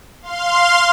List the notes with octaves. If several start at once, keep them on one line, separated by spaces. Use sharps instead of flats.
F5 C6